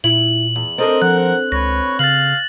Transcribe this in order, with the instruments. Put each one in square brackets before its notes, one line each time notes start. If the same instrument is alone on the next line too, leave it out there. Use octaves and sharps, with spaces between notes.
[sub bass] A#2 [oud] E4 [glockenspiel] F#7
[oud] E2
[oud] C4 D4 A4 [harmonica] A#4 D#5
[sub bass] F3 [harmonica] A#4 F#5 [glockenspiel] F#6
[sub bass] C#2 [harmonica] B4 C#5 [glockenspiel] A#6
[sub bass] C#3 [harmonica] F5 [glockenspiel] A6 F#7